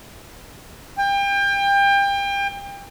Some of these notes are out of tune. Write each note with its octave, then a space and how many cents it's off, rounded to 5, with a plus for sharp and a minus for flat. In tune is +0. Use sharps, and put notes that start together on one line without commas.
G5 +30